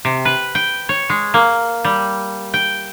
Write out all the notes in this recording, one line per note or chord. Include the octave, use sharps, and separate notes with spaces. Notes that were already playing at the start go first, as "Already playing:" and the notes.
C3
B4
G5
C#5
G#3
A#3
G3
G5